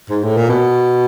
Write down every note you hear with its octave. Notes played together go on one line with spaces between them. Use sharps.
G#2
A2
A#2
B2